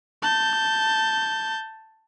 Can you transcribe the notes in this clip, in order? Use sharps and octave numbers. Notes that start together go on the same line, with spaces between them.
A5 G6